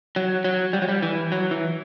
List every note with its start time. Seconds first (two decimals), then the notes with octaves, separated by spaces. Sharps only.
0.16 F#3
0.44 F#3
0.73 G3
0.82 F#3
0.89 G3
1.02 E3
1.32 F#3
1.51 E3